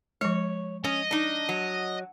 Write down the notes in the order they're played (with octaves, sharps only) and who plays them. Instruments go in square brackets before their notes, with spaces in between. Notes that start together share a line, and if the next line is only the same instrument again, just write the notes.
[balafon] F3 G#3 [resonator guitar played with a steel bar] C#5
[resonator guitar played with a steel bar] C#4 [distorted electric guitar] D#5
[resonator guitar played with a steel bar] D4 D#4
F#3